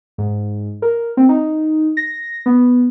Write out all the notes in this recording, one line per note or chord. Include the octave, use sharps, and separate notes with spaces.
G#2
A#4
C4
D#4
A#6
B3